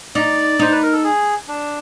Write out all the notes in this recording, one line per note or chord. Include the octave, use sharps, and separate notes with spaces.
D#4 D5
D#4 C5
B4
A#4
A4
G#4
D4